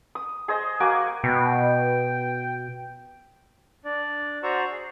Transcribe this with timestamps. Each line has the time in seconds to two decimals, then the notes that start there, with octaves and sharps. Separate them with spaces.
0.15 D#6
0.48 G#4 C5 D#5
0.80 A#3 F#4 G#5 D6
1.24 B2 G5
3.85 D4 D5
4.43 F#4 C5 D5 A#5 C#6 E6
4.71 G#4